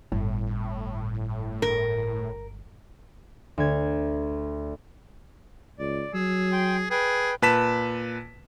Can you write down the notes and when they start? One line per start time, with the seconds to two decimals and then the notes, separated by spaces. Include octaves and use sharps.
0.12 G1 A2
1.62 A#4
3.58 D2 G#6
5.79 C#2 D5
6.14 F#3 G#4 E6
6.52 G5 C6
6.91 G#4 B4 G5
7.42 A#2 B4 A5 B6 E7